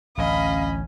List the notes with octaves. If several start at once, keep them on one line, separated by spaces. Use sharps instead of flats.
A1 D2 A2 C#4 D#5 F5 B5